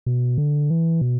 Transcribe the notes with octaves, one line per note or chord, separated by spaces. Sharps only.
B2
D3
E3
B2